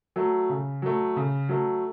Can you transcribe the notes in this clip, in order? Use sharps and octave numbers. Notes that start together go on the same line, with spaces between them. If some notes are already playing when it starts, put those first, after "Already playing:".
F#3 A3
C#3
F#3 A3
C#3
F#3 A3